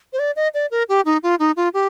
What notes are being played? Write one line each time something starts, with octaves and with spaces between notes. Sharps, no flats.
C5
D5
D#5
D5
A#4
G4
D#4
F4
D#4
F4
G4